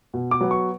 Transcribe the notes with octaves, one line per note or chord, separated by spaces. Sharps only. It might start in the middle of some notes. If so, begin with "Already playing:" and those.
B2
D6
F#3 B3
C#6